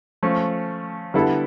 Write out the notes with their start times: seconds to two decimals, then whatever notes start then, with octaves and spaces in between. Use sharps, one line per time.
0.23 F3 A3 C#4
1.14 D3 G3 B3 E4 A4